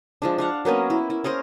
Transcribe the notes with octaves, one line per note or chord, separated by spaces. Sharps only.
F3 G#3 D4
D4 F5 F#5
F#3 A#3 B3 C#4
E4
E4
C#4 G#4 A#4 C5